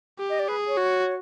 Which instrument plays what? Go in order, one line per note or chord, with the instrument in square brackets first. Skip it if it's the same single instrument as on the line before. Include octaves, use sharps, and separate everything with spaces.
[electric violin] G4
[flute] D#5
D5
[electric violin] G#4 [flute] B4
[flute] C#5
[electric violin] F#4